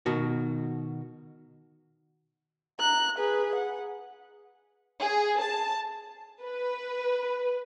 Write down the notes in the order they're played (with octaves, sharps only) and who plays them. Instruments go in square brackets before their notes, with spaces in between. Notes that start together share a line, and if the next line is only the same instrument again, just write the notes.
[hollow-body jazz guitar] B2 D#3 F#4
[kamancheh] A#5 F#6
G#4 B4
F#5
[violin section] G#4
A5
B4